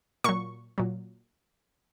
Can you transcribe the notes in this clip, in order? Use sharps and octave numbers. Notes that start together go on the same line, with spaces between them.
A#2 F#3 C#6
A#2 F#3